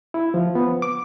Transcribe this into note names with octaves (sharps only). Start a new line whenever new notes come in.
E4
F3
B3
D6